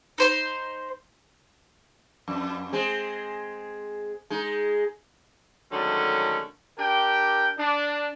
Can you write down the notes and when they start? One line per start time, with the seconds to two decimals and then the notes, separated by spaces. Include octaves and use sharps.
0.18 D#4 C5 C6
2.28 F2
2.73 G#3 C4 G#4
4.30 G#3 D#4
5.71 D3 D#3 F#3 G#3 A3 C#4
6.77 D4 G4 A#4 G5
7.57 D4